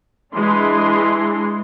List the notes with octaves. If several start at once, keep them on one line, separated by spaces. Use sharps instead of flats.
E3 G#3 D4 C6